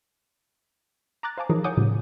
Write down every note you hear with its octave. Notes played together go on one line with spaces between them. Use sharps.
A#5 D6 F#6 A6
C5 F5 G#5 A5 D6
E3 F3 D#4 G#4 A#4 C#5
C#5 F#5 G#5 D6 D#6 G6
A2 C#3 F3 G3 A#3